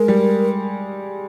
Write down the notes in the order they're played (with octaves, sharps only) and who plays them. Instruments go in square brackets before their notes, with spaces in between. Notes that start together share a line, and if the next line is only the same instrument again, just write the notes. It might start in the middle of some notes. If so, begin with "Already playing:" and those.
Already playing: [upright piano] G#3 [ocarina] A#4
[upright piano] G3